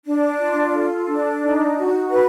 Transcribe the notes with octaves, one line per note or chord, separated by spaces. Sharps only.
D4
F4
A4
D4
D#4
F#4
B4